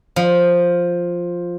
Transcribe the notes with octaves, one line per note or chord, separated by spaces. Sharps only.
F3